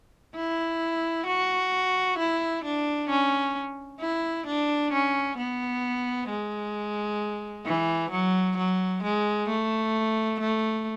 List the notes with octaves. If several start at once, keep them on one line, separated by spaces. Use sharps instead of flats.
E4
F#4
E4
D4
C#4
E4
D4
C#4
B3
G#3
E3
F#3
F#3
G#3
A3
A3